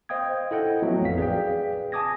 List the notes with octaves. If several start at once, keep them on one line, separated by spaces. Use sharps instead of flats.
C5 D#5 F5 G5 D#6 G#6
E4 A4 D#5 F#5 G5
F3 F#3 A3 B3
A1 F2 F5 B6
G#4 B4 D5 F5 G5
G#5 A5 D6 D#6 G#6 A#6